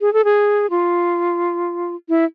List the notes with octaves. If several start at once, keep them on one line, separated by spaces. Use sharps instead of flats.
G#4
A4
G#4
F4
E4